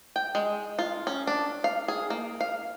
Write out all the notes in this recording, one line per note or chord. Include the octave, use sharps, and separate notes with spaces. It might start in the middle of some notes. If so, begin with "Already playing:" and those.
G5
G#3
F4
C#4
D4
F5
G#4
A#3
F5